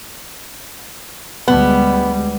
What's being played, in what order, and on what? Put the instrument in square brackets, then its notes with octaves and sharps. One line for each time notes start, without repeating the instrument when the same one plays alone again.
[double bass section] D2 G3 G#3 [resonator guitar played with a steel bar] B3